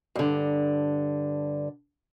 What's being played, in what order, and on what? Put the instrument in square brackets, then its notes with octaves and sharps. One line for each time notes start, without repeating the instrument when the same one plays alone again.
[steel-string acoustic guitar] G2 D3